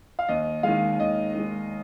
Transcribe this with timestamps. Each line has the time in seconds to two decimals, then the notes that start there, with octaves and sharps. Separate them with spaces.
0.19 F5
0.29 D#2 D#5
0.63 D#3 G#3 F5
0.99 D#2 D#5
1.34 D#3 G#3